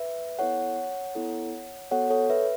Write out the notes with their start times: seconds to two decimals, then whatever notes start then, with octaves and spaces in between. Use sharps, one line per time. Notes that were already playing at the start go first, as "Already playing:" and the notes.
Already playing: B4 E5
0.38 B3 E4 A4 C#5 F#5
1.15 B3 E4 A4
1.91 B3 F#4 A4 C#5 F#5
2.10 A4 C#5
2.30 B4 E5